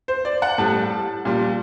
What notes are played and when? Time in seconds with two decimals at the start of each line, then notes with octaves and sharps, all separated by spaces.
0.08 C5
0.25 D5
0.42 F#5
0.58 A2 G3 A5
1.25 A#2 G3